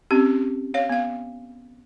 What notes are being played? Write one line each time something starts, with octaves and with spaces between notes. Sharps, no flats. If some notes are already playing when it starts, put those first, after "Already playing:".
C4 C#4 G4
C#5 F5
B3 F5